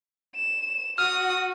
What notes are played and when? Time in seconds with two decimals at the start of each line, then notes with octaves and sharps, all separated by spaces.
0.36 E7
0.98 F#4 D#6 F6